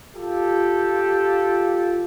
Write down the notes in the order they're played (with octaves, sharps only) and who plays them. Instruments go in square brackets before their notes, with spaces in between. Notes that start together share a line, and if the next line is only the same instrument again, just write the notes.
[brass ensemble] F4 G4 A4